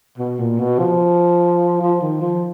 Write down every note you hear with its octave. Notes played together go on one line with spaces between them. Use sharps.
B2
A#2
B2
F3
F3
D#3
F3